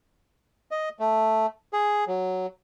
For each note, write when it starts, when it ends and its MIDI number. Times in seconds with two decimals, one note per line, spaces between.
0.71 0.89 75
0.99 1.46 57
1.73 2.04 68
2.07 2.46 54